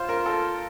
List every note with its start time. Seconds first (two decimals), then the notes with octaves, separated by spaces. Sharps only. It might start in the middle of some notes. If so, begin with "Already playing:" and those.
Already playing: F4 C5
0.09 A#4
0.26 A4